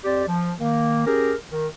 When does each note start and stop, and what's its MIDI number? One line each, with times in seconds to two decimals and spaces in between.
0.04 0.23 41
0.04 0.23 60
0.04 0.23 67
0.04 0.23 74
0.27 0.52 53
0.59 1.03 51
0.59 1.03 58
1.06 1.33 61
1.06 1.33 67
1.06 1.33 68
1.06 1.33 70
1.50 1.67 51